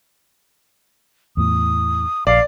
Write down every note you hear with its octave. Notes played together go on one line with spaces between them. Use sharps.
E2 A2 D#6
A#1 D5 F5